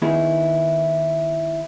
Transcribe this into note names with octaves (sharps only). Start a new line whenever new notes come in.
D#3 B3 D#4 E4 G#4